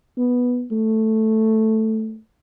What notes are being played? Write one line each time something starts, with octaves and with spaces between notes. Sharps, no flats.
B3
A3